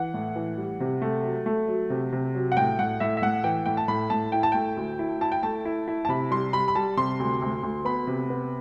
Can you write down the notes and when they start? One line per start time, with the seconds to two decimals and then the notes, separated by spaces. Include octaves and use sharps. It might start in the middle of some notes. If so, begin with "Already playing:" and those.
Already playing: E3 F#5
0.14 A2
0.36 E3
0.57 G3
0.80 C3
1.02 A3
1.23 F#3
1.46 A3
1.68 F#3
1.90 C3
2.12 C3
2.35 F#3
2.52 F#5
2.57 A2 G5
2.79 A2 F#5
3.00 A2 E5
3.17 E5
3.22 A2 F#5
3.44 E3 G5
3.66 A2 G5
3.77 A5
3.88 A2 B5
4.10 A2 A5
4.32 E4 G5
4.43 A5
4.52 A3 G5
4.77 D2
4.99 E4
5.21 E4 A5
5.32 G5
5.43 A3 A5
5.65 E4
5.88 E4
6.05 A5
6.09 C3 B5
6.31 G3 C6
6.53 G3 B5
6.68 B5
6.75 G3 A5
6.97 C3 C6
7.20 D2
7.42 D2
7.63 D2
7.85 B3 B5
8.07 C3
8.30 B3